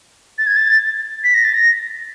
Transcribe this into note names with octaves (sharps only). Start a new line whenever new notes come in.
A6
G#6
A6
B6
A#6
A6
A#6